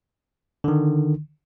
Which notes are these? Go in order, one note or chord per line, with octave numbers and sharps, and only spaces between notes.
D3 D#3